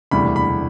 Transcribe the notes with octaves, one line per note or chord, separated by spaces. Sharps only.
E1 D2 C3 E3 G3 B5
B5